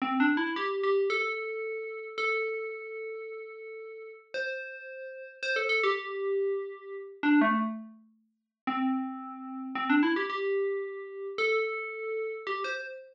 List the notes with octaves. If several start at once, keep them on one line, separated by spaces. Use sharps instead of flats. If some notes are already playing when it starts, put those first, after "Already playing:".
C4
D4
E4
G4
G4
A4
A4
C5
C5
A4
A4
G4
D4
A3
C4
C4
D4
E4
G4
G4
A4
G4
C5